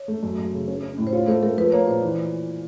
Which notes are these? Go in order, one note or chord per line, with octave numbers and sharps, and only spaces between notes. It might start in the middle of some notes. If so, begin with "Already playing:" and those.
Already playing: C#5
A3
F#2
F#2
C#3
C#4
C#4
A2
C5
F4 C#5
A3 C5
A3 A#4
F3 B4
A#3 C#5
A#2 C5
E3